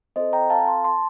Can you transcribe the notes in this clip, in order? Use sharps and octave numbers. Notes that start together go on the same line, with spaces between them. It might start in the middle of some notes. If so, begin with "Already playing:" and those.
C4 F4 A4 C5 D#5
G5 A#5
F5 A5
A5 C6
A5 C6